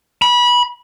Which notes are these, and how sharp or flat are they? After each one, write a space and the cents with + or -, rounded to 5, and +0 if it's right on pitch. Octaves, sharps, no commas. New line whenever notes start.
B5 -25